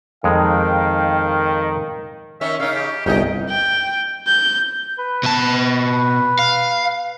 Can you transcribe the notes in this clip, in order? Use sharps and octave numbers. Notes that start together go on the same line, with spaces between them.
F2 D#3 G#3 F5 G5
D#3 C#4 E5
C#3 D#4 F5
G4
G1 C2 D#4 G#4 D#5 G5
G5
G6
B4
B2 A5
F5